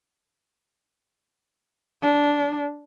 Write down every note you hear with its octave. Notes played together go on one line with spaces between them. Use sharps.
D4